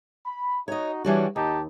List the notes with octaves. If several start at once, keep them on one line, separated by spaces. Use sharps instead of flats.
B5
D#4 F#4 C#5 D#5
E3 G3 D4 F#4 G#4 C#5
D#2 D#4 G4 A5